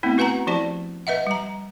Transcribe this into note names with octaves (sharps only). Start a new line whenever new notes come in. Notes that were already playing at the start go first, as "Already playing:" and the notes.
A3 B3 C4 E4
F#4 B4 F#5 G#5 A#5
F3 E4 G4 D5 A5
B4 D#5 E5 F#5
G3 A#5